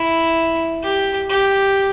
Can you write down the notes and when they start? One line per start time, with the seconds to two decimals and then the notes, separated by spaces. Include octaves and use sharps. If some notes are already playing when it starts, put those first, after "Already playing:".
Already playing: E4
0.84 G4
1.30 G4